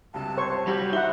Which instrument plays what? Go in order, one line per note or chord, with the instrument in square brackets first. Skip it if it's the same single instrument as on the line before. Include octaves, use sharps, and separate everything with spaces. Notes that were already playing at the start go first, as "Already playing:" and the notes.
[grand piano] C#2 G2 C3 [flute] A5
[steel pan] C5 C#5 C#6
[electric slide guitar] G3 F#4 [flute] G4
[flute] D#4 [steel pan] E4 F#5 [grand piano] C5 E5 G7